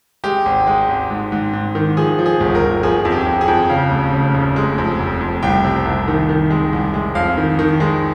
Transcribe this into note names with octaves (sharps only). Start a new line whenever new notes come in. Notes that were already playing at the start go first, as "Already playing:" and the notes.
G#3 G4
G#1
G#3
G#1
G#2
G#2
G#2
D#3
F3 G#4
F3
G#4
G1
A#4
G1
F3 G#4
F2
G4
F2
G#4
F2
C#3 F5
F1
C#3
F1
G#3
F2
F1
F2
C2 G5
C3
C2
D#3
D#3
G#3
C2
G#3
F2 F5
D#3
D#3
G#3